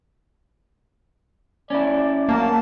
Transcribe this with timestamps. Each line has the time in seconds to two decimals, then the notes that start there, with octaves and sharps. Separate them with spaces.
1.70 C#4 E4 D5
2.29 F#3 A#3 A5